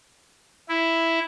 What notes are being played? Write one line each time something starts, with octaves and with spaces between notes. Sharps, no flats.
E4